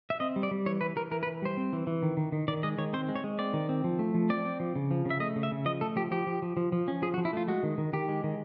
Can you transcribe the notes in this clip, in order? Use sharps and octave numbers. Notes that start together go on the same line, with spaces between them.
E5
C4 D#5
G3
D5
G3
E3 C#5
E3 B4
E3 A#4
E3 A#4
B4
E3
G3 C5
C4
E3
E3
D#3
D#3
D#3
D#3 D5
G#3 D#5
D#3 C#5
C4 C5
G#3
C#5
G#3
C4 D5
D#3
C4
F3
A3
F3
C4 D5
C4
F3
C#3
F3
C#3
E5
A3 D#5
C#3
E5
C#3
F3 D#5
A3 A4
F3 G4
F3 G4
F3
F3
F3
F3
C#4
F3 G#4
F#4
F3
E4
A3 F4
G#3 F#4
D#3
D#3
D#3 G4
G#3
D#3